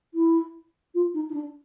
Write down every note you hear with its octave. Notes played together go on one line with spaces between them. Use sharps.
E4
F4
D#4
D#4
D4